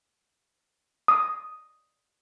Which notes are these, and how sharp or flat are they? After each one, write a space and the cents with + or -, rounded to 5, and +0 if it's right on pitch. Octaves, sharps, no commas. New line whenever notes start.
D#6 +5